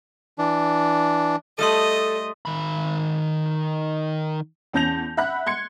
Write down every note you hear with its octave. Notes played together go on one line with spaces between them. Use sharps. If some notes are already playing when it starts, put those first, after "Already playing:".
E3 D4
G3 A3 A4 D#5 C6 D#6 D#7
D#3 B5
E2 C#4 A5 G6 A#6 F7
E5 F#5 B5 F#6
C6 G#6 C#7